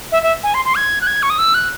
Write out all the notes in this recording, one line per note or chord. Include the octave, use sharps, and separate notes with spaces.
E5
E5
G#5
C6
C6
G#6
F#6
G#6
C#6
D#6
E6
F#6